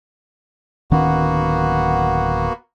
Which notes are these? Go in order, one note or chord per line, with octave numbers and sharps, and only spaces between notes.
D1 D#3 A#3 B3 C#4 F#4